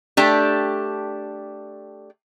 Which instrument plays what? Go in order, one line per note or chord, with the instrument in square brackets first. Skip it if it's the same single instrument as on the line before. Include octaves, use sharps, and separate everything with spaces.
[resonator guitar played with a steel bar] A3 D4 G4